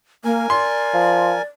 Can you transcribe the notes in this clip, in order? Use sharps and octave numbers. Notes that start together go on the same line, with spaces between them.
A#3 A#4 G#5
D5 C6
F3